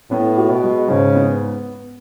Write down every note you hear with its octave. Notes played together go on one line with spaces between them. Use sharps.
A2 B3
F#4
B2
G#3
G#2 C#3
B3